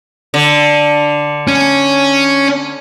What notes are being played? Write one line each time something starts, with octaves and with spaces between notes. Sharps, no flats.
D3
C#4